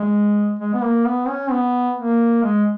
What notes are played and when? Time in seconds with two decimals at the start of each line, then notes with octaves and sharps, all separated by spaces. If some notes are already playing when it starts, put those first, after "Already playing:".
Already playing: G#3
0.59 G#3
0.74 B3
0.83 A#3
1.06 B3
1.28 C#4
1.51 B3
1.97 A#3
2.43 G#3